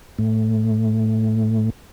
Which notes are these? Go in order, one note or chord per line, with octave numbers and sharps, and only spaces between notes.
A2 A3